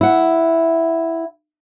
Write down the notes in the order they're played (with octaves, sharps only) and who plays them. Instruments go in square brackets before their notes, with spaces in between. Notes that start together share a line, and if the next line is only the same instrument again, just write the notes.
[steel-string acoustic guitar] E4 F#5